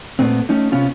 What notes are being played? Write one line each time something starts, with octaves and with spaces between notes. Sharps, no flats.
A#2 A3 B3 C4
A3 C#4 D#4
C3 B3 C#4 F4